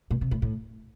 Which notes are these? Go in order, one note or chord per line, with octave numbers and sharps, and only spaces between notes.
A#2
C3
A2
A2